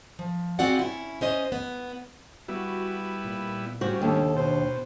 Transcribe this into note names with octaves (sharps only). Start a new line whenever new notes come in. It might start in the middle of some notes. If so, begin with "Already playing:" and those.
F3
C4 F4 F#4 G#4 D5 F#5
C#4 E4
C#4 C5 D#5
B3
G3 B3 E4 F#4
A#2
C#3 G3 F#4 C5
D#2 D4 A4
B2 C5